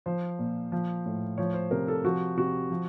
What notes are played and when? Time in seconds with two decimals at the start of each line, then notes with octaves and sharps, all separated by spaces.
0.06 F3 C5
0.39 A#2
0.72 F3
1.06 A2
1.38 F3 C#5
1.54 C5
1.71 C3 A#4
1.88 A4
2.04 F3 F#4
2.37 C3 F#4
2.70 F3